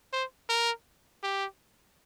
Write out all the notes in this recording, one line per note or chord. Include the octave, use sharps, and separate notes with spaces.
C5
A#4
G4